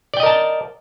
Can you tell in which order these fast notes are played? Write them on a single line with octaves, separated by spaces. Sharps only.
D5 G5 D#5 A#4 A5